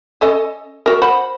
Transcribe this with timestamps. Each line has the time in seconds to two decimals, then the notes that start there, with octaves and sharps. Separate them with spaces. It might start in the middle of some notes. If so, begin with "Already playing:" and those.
0.21 C#4 A4 D#5
0.86 F#4 A#4
1.02 C5 F#5 B5